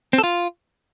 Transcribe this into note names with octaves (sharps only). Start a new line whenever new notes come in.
C4
A4
F4